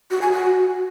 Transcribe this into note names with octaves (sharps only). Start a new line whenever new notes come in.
F#4
G#5
F#4